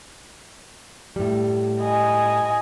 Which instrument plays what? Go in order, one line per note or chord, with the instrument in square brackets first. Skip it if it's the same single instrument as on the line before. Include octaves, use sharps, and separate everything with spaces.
[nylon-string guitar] A2 G3
[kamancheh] D#5 G#5